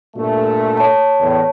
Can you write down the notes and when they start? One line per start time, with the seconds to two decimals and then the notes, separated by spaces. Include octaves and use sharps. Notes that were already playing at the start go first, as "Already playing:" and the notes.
0.16 G2 A#2 A3
0.77 C#5 A5
1.20 E2 A2